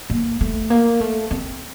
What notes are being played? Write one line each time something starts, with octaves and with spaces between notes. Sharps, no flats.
A#3
A3
A#3
A3
C4